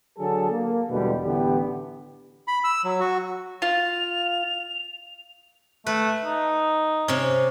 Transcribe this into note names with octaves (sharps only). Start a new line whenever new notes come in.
D3 F#3 G#4 A4
A#3
E2 B2 D3 G3 G#3 B3
A1 D3 E3 B3 G4
B5
E6
F#3
F#4
F4 F7
A3 B4
D#4
C3 C#4